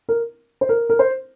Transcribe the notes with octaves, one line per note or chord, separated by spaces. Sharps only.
A#4
C5
A#4
A#4
C5